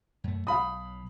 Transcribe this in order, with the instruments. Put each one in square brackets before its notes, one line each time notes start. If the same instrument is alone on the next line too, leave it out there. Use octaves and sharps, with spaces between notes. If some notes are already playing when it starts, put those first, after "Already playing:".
[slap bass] F#2 A3
[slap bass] B1 [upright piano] F5 B5 D#6